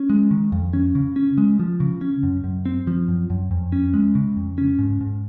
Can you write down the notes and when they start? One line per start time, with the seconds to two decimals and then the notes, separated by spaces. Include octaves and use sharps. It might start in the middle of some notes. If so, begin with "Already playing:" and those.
Already playing: C#4
0.10 G#3
0.31 D#3
0.52 F2
0.73 C#4
0.95 C#3
1.16 C#4
1.38 G#3
1.59 F3
1.80 C#3
2.01 C#4
2.23 F#2
2.44 F#2
2.65 C4
2.87 F3
3.08 F#2
3.30 F#2
3.51 F2
3.72 C#4
3.94 G#3
4.15 C#3
4.37 F2
4.58 C#4
4.79 G#2
5.01 G#2